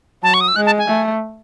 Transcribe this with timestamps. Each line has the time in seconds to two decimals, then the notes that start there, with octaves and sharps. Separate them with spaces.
0.23 F#3 A5
0.34 C#6
0.41 D#6
0.48 E6
0.56 G#3 F#6
0.66 A5
0.78 G#5
0.88 A3